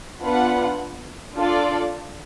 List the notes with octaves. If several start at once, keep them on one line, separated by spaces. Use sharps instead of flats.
B3 D4 F4 B4 F#5
D4 F4 A4 D5